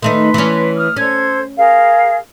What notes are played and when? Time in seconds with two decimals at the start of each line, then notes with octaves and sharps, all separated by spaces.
0.02 D#3 A3 D#4 B4 C6
0.34 E3 C#4
0.76 D#6 F6
0.96 C#4 A4 C5 G#6
1.56 G#4 A#4 F5